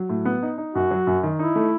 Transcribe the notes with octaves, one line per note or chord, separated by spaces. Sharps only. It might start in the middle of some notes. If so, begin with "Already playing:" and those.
Already playing: F#3
A2
B3
D#4
D#4
F#2 F#4
F#3
F#2
D#3
D#4 E4
A3